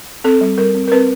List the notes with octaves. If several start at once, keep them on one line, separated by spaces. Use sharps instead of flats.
C4 A4
G3
G3 A#4
C4
A#4
C4 B4